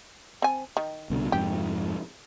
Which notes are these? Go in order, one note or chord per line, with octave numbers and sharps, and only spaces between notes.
C4 G#5
D#3
C2 B2 D3
F2 G#2 C3 G4